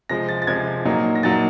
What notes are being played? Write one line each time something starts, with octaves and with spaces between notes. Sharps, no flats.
C3 F3 G#3 A#6
A6
A6
C3 F3 G#3 G#6
A#2 F#3 A#3 D#4
A#6
A#2 F#3 A#3 D#4 A6